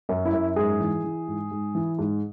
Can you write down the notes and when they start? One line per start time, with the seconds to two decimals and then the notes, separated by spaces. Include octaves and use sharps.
0.09 F#2
0.25 E4
0.33 F#2
0.56 G#2 G#4
0.80 E3
1.04 E3
1.28 G#2
1.51 G#2
1.75 E3
1.99 G#2